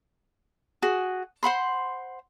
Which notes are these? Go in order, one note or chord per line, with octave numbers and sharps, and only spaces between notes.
F#4 G#4
C5 F#5 B5 C6